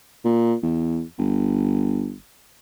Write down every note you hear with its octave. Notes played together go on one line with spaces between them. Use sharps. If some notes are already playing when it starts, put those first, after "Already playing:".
A#2
E2
G1